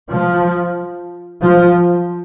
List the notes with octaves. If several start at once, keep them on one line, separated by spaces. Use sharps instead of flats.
F3
F3